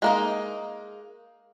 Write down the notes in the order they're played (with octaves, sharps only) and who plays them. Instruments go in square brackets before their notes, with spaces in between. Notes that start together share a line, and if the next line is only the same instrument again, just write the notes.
[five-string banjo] G#3 A#3 D#4